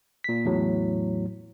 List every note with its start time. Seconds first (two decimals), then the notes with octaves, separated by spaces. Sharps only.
0.24 A#2 B6
0.45 E2 A2 F#3